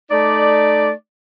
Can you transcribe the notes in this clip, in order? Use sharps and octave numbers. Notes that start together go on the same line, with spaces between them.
A3 D#4 D5